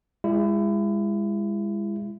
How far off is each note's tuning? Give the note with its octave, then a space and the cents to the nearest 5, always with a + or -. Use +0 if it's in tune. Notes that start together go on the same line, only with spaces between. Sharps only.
G#3 -30 E4 +30